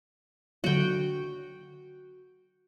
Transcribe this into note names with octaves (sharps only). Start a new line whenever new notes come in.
D3 F#3 F#4 G5